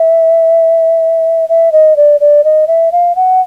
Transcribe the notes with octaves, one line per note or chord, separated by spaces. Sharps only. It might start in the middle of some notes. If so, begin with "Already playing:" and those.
Already playing: E5
E5
D#5
D5
D5
D#5
E5
F5
F#5